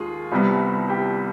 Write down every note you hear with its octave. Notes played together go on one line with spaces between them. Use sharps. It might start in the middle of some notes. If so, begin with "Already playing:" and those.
Already playing: D#2 D#3 G#3 F4 G#4
C2 C3 G3 B3
G4